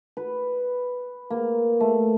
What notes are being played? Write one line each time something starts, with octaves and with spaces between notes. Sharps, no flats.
B4
A#3
A3